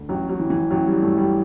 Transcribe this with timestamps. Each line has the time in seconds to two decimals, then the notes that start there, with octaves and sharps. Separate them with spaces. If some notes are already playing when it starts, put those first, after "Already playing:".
Already playing: D2
0.09 A1 F#3
0.29 F#3
0.40 E3
0.50 E3
0.71 A1 F#3
0.87 G3
1.02 G2 A3
1.18 G3